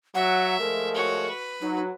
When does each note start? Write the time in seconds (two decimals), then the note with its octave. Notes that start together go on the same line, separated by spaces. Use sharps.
0.15 F#3 E5 F#5
0.59 F3 G#3 A3 A#4
0.95 F#4 C#5
1.29 B4
1.61 F#3 D#4